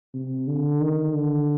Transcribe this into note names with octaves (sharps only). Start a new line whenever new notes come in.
C3
D3
D#3
D3